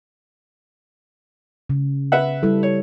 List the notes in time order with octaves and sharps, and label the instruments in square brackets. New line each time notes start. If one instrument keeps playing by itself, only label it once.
[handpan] C#3
[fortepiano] B4 E5 F#5
[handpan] G3 E4 A4
[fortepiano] C#5